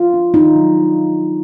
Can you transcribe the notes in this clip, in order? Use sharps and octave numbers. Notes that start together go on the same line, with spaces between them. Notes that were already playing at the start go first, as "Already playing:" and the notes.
Already playing: F4
D4
D4 D#4
F#3